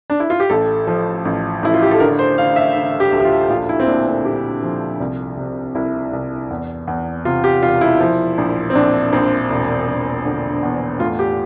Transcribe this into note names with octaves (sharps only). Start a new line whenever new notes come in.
D4
E4
F4
G4
A1 A4
F3
A1
A1 E4
F4
G4
A4
D3 A#4
C5
D3 F5
E5
D3
G4
D2
G4
F4
A#1 F4
E4
C4
A#2 D4
C4
A#1 G4
F3
C2
C3
C2 E4
C2
E2
E2
C3 F4
G4
E1 F4
E4
F3
A#1
C4
A#1 D4
A#1 C4
E1
E1
D3
E2
A2 F4
G4